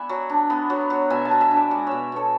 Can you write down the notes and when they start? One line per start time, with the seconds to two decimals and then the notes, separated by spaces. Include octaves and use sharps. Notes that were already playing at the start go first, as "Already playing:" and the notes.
Already playing: B3 E4 D5 E5 F#5 G#5
0.09 F#3
0.30 D4
0.50 B3
0.70 F#3
0.90 F#3
1.10 B2 E5 G#5
1.25 F#5 A5
1.31 B2
1.41 E5 G#5
1.51 D4
1.56 D5 F#5
1.71 G#3 D5 F#5
1.86 B2 C#5 E5
2.12 B2 A4 C#5